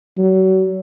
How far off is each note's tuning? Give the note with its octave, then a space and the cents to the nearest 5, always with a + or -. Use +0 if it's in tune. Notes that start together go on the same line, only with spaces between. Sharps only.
F#3 +35